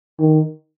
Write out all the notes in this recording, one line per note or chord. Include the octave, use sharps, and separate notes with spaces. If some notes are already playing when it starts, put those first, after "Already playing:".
D#3